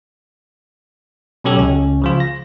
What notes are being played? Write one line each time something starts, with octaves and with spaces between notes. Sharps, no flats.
B2 F#3 C#4 G4 A4 C#5
C#2 C#4
C#3 F3 F4
A#6